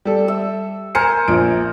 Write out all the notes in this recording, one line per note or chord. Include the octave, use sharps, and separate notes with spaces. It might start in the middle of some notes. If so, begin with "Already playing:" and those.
G3 A4
E5
A#4 C5 G#5 C#7
A#1 F3 D7